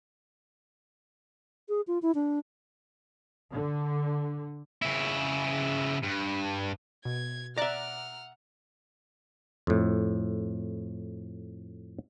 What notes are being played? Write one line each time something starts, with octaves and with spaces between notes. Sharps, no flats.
G#4
F4
E4
D4
D3
C#3 E4
G2
B2 G#6
D5 E5 F#5 A#5 D6 F6 F#6
F2 A2